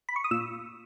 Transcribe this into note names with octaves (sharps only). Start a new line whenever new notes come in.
B5
C#6
D#6
A#2 E6